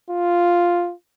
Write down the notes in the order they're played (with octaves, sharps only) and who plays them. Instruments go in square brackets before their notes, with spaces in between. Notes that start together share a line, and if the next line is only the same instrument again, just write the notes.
[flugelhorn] F4